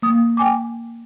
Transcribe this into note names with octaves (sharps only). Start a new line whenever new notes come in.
A#3 D#6
G5 G#5 D6